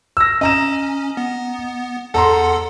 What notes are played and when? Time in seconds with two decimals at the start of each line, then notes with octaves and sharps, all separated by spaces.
0.17 E6 A#6
0.41 C#4 D#5 A#5 E7
1.17 B3
2.14 E2 A4 F#5 A5 A#5 C6